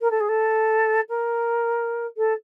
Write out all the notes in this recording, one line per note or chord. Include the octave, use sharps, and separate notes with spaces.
A#4
A4
G#4
A4
A#4
A4